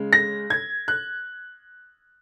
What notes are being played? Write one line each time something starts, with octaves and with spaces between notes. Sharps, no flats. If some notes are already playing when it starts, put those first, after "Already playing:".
Already playing: C#3 G#3
A#6
G#6
F#6